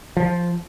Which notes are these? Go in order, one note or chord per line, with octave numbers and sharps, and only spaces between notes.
F3